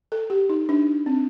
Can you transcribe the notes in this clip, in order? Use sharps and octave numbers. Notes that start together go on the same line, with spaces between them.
A4
G4
D#4
D4
C4
D4